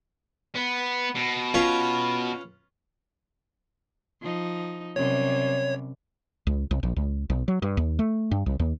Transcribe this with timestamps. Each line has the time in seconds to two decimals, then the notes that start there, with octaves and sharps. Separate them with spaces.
0.55 B3
1.15 B2
1.54 C#4 F4 B4
4.21 F3 D#4
4.96 F#2 C3 G3 C#5
6.47 C#2
6.71 C2
6.83 A#1
6.96 C#2
7.30 B1
7.48 F#3
7.62 G2
7.77 D#2
7.99 A3
8.31 G2
8.46 C2
8.60 D#2